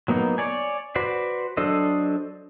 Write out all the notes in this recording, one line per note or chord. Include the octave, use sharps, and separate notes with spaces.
F#3 A#3 B3 D#4
C#5 D5 G#5
F#4 B4 C5 D5
F#3 D4 A4 C5 D#5